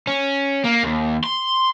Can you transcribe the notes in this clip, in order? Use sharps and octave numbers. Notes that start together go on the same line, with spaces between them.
C#4
A#3
D#2
C6